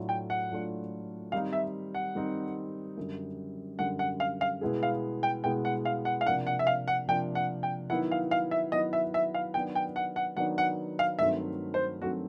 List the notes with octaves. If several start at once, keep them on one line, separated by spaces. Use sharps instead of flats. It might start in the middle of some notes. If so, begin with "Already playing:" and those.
Already playing: A2 F#3 A3 D4 F4
G5
F#5
A2 F#3 A3 D4 F4
D#3 G3 C4 D#4 F5
E5
F#5
D#3 G3 C4 D#4
F#2 D3 G3
F#2 D3 G3 F#5
F#5
F5
F5
B2 G#3 B3 E4 G#4
F5
G5
B2 G#3 B3 E4 G#4 G5
F#5
F5
F#5
F5
C3 F3 A#3 D4 F#5
F#5
E5
F5
F#5
C3 F3 A#3 D4 G5
F#5
G5
D#3 F#3 B3 E4 F#5
F5
F5
E5
D#3 F#3 B3 E4 D#5
E5
E5
F5
D#3 F#3 B3 D4 G5
G5
F#5
F#5
D#3 F#3 B3 D4 F#5
F#5
F5
G2 D#3 F#3 A3 C4 E5
C5
G2 D#3 F#3 A3 C4 F#4